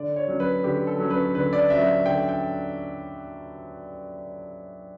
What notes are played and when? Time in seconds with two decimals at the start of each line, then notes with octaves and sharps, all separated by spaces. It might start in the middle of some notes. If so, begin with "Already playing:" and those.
Already playing: D3 D5
0.16 C#5
0.28 F#3 C#4
0.40 B4
0.63 D3 G4
0.87 A4
0.99 F#3 C#4
1.10 B4
1.35 D3 B4
1.53 D5
1.70 F#3 C#4 E5
2.06 D3 G5
2.29 G5